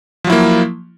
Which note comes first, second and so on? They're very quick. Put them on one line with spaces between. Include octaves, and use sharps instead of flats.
F3 F#3 E4 A#3